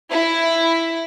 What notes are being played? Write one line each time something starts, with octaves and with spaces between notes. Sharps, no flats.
E4